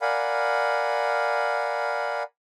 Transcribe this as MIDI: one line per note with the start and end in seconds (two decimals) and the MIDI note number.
0.02 2.23 70
0.02 2.23 74
0.02 2.23 77
0.02 2.23 78
0.02 2.23 80
0.02 2.23 83